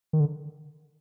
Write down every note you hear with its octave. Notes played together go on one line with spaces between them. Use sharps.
D#3
D3